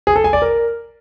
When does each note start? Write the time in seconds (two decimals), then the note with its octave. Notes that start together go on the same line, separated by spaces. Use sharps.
0.07 G#4
0.16 A4
0.24 G#5
0.33 D5
0.42 A#4